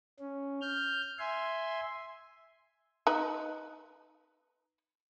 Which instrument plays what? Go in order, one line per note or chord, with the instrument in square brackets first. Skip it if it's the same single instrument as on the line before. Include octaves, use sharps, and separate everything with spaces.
[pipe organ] C#4
F6 G6
E5 G#5 C6
[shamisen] D#4 B4 A#5